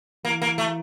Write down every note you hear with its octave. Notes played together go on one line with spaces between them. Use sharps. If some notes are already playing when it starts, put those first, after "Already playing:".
E3 A#3
A#3
A3